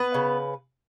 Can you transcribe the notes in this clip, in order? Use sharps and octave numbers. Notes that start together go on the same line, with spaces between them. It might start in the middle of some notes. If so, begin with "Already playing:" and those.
Already playing: B3 B4
C#3